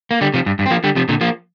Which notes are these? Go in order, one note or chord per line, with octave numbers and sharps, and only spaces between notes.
A#3
D3 G3
C3 F3
G2
G2
C4
F3 A#3
D3 G3
C3 F3
A#2 D3
F3 A#3